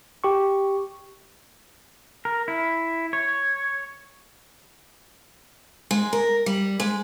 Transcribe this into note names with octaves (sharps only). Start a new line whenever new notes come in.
G4 C#6
A#4
E4
C#5
G#3
A#4
G3
G#3